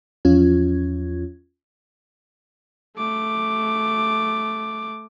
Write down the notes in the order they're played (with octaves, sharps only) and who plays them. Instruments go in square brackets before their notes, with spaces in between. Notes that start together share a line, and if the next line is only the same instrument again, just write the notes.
[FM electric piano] E2 F3 C#4 F4 G#6
[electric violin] A3 D6